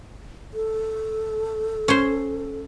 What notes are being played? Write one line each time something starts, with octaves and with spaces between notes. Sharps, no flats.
A4
C#4 C5